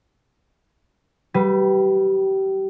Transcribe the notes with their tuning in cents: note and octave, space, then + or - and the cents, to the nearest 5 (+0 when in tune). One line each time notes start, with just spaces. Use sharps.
G3 -25 B4 +5